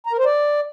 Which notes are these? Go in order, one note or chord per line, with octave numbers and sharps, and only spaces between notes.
A#5
A#4
C5
D5